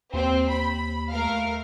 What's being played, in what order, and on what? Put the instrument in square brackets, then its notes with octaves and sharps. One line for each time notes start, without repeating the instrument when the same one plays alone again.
[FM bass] D#2 [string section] C4
[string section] B5
A3 A#4 F5